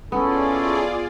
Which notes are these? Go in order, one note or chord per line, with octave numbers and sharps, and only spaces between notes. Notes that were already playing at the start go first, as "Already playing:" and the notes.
B3 C#4 E4 F4 G#4 A4 D5